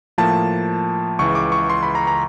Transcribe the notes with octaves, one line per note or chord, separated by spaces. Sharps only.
A2 F3 A#3 A5
C#2 C#3 E3 C#6
D6
C#6
C6
B5
A#5
A#5